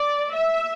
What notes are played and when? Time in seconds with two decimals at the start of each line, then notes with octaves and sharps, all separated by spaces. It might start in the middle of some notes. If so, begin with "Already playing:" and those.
Already playing: D5
0.34 E5